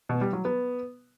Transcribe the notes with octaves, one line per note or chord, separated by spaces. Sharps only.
B2
G3
F#3
B3